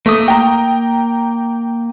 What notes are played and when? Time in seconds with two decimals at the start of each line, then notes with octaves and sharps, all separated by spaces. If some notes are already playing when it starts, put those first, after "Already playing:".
0.06 A3 A#3 D#6
0.28 G5 A#5